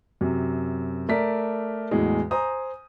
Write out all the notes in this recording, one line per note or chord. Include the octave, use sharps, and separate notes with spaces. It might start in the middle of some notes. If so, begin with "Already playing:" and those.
F#2 C3
A3 A#4 D5 B6
E2 A2 F#3 G#3
C5 G#5 A#5 D#6